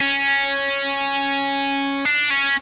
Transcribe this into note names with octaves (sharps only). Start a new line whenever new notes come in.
C#4
D4
C#4